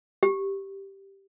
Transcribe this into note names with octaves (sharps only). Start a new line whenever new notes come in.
G4